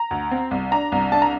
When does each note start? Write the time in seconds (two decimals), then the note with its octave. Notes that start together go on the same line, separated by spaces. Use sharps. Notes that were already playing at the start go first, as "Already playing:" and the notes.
Already playing: A#5
0.11 D2
0.31 C4
0.51 C2
0.71 D4 A#5
0.92 C2
1.12 D4 A5
1.22 A#5